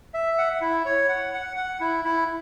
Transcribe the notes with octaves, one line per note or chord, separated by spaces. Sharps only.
E5
F#5
E4
C#5
F#5
F#5
F#5
E4
E4